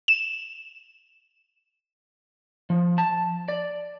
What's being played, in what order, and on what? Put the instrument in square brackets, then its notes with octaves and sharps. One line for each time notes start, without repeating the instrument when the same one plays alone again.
[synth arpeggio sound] E7
[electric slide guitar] F3
A5
D5